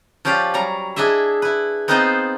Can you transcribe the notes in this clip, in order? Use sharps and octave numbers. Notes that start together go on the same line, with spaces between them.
F3 C#4 G4 D5 F5
F#3 G3 A#5
D4 E4 G#4 D#5 E5
E4 B4
B3 C4 D#4 F4 C5 D#5